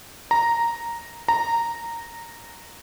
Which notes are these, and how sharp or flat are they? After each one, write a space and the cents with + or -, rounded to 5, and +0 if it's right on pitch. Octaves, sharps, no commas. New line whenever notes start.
A#5 +0
A#5 -10